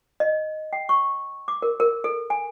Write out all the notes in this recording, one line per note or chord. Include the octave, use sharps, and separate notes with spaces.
D#5
G5
C#6
D6
A#4
A#4
A4
G#5